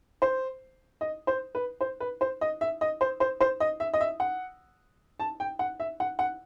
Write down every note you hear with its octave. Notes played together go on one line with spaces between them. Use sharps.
C5
D#5
C5
B4
C5
B4
C5
D#5
E5
D#5
C5
C5
C5
D#5
E5
D#5
E5
F#5
A5
G5
F#5
E5
F#5
F#5